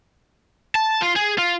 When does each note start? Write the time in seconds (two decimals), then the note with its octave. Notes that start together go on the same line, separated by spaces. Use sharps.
0.75 A5
1.02 F4
1.16 G#4
1.39 F4